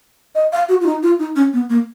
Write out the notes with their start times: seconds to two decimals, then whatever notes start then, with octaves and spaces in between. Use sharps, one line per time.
0.35 D#5
0.52 F5
0.69 F#4
0.81 F4
0.86 D#4
1.03 F4
1.19 D#4
1.36 C#4
1.53 B3
1.70 A#3